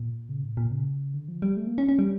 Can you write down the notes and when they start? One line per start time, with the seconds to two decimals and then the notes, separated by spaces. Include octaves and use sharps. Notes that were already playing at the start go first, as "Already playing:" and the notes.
Already playing: A#2
0.29 C#3
0.44 A2
0.57 A#2
0.71 C#3
1.14 D3
1.28 F3
1.42 G3
1.57 A3
1.67 A#3
1.78 C#4
1.89 C#4
1.99 G3